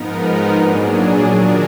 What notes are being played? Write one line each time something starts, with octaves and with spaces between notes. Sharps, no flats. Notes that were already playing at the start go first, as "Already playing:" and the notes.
Already playing: G#2 F3 B3 D#4 A#4
A#2 F#3 D4 G#4
D#3 F#3 D4 F#4 A#4